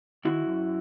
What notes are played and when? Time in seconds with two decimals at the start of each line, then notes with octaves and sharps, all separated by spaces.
0.25 D#3 E4 F#4
0.47 F#2